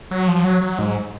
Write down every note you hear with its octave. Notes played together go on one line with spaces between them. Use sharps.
F#3
F3
F#3
F#3
G#2